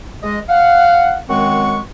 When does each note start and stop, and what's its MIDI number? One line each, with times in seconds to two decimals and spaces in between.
0.23 0.39 56
0.23 0.39 75
0.49 1.18 77
0.49 1.18 78
1.29 1.79 42
1.29 1.79 51
1.29 1.79 56
1.29 1.79 60
1.29 1.79 78
1.29 1.79 85